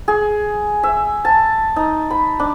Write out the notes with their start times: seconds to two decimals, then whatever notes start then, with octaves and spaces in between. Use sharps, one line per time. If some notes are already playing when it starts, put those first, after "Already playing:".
0.08 G#4
0.83 E5
1.25 A5
1.76 D#4
2.10 B5
2.40 D4